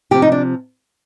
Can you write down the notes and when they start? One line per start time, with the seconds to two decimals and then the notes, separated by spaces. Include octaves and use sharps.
0.11 C3 F3 C4 G4
0.22 D#4
0.32 D4